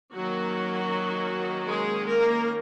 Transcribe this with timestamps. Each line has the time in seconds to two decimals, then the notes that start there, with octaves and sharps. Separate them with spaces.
0.13 D#3 F#3 A#3 C#4 F#4
1.67 G#3 G#4
2.07 A#3 A#4